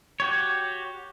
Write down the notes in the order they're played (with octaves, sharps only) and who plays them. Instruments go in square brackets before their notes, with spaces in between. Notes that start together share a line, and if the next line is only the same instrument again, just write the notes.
[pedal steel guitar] F#4 G4 C#5